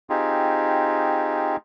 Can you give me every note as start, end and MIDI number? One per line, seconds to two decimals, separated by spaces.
0.10 1.57 60
0.10 1.57 63
0.10 1.57 65
0.10 1.57 67
0.10 1.57 68